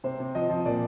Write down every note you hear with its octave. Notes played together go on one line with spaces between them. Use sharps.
C3 C5
C3
F3 D#5
F3
A#2 D5